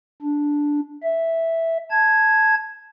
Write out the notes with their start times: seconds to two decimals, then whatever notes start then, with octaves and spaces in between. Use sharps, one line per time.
0.22 D4
1.03 E5
1.91 A5 G#6